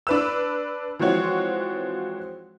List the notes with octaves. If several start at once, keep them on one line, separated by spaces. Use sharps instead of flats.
D4 B4 E6
E3 F3 G#3 C4 F#4 C#5